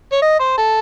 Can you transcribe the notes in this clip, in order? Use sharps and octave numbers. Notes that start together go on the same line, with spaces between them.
C#5
D#5
C5
A4